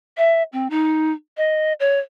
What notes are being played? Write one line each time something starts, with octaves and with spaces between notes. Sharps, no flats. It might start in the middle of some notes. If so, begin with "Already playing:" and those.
E5
C4
D#4
D#5
C#5